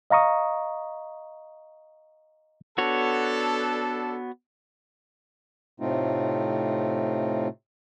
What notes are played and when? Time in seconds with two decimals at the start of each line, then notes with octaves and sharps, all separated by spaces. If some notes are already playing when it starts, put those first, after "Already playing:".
0.10 D#5 F5 A#5 C#6 D#6
2.78 B3 D4 F#4 A4 C#5
5.80 A2 C3 A3 C4 D#4 F4